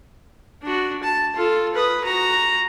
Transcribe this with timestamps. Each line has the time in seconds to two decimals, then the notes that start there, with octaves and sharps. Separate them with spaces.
0.63 D4 F#4
1.03 A5
1.35 F4 A4
1.75 B4 D#6
2.04 F#4 A#5